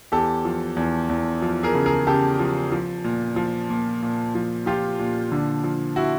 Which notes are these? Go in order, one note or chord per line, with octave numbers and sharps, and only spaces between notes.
E2 G4 A4
F3
E2
E2
F3
G#4 A#4
C#3
G#4 A#4
C#3 G4 A4
F3
F3
A#2
F3
A#2
A#2
F3
F3 F4 G4
A#2
D3
F3
E4 F#4